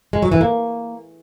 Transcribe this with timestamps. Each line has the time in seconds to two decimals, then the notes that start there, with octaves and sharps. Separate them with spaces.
0.13 G#3
0.22 F#3
0.32 E3
0.41 A#3